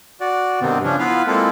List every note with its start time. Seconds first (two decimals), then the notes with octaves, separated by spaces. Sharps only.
0.20 F#4 D5
0.61 G2 C3 D#3 B3 C4
0.83 C#3 F3 C#4 D4
0.99 B3 E4 F4 B4 F5
1.27 G#3 A#3 C4 E4 F4 A4